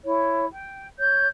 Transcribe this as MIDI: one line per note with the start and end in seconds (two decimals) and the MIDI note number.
0.05 0.46 64
0.05 0.46 73
0.53 0.87 79
1.00 1.28 73
1.00 1.28 91